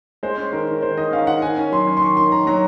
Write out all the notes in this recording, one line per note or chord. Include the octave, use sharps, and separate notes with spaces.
G#3 C5
C#4
D#3 A#4
D#3
D#3 C5
D#3 D#5
C#4 F5
D#3 F#5
D#3 G#5
C#4
F#3 C6
C#4
C6
D#3 C#6
D#3 C6
D#3 A#5
F#3 A#5